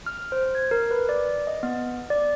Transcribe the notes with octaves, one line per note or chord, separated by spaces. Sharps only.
F6
C5
G#6
A#4
B4
D5
D#5
B3
D5